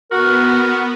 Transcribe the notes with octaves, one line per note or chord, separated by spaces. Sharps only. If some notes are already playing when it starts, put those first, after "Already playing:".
B3 F#4 A#4